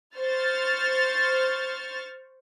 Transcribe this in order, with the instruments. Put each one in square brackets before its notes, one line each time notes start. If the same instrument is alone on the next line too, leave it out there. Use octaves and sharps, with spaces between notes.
[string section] C5 C#6 F6 A6